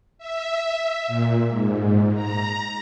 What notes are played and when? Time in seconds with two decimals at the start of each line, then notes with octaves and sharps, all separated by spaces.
0.18 E5
1.08 A#2
1.48 G#2
2.14 A#5